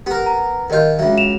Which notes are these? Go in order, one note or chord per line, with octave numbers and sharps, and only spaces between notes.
B3 G4 A#4
A#5
D#2 F4 A#4 D#5 G6
C#2 F#3 E5
E7 F7